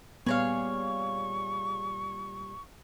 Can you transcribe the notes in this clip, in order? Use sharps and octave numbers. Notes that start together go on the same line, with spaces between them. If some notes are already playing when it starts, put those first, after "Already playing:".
A#2 G3 B3 G#4 C#5 F5 C#6